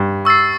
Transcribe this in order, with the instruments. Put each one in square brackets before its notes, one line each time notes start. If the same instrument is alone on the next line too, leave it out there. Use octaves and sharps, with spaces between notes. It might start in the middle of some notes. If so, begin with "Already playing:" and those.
Already playing: [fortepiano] G2
[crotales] C#6 E6 A6 C7